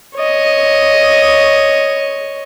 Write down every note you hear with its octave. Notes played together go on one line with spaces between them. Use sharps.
C#5 D#5